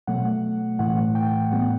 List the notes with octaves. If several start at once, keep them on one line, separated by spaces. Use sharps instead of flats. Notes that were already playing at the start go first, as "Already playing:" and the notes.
B2 F#3 A3 F#5
A2 E3 A3 F#5
G5
A2 G3 B3 F#5